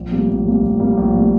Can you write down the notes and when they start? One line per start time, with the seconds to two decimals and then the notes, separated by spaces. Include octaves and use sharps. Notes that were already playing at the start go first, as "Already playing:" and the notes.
Already playing: A#1
0.11 A2 G3 A#3
0.28 A#1
0.45 A2 G3 A#3
0.62 A#1
0.80 A2 G3 A#3
0.97 A#1
1.14 A2 G3 A#3